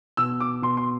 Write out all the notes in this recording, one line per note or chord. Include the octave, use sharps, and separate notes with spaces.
B2 E6
D6
B2 C6
C6